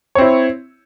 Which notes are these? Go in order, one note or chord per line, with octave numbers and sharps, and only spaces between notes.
C4 E4 C#5